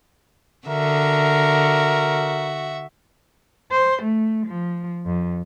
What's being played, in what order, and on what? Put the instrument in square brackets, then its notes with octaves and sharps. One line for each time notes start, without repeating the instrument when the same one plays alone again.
[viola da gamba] D3 [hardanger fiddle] F#4 E5 [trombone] A#4
[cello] C5
A3
F3
F2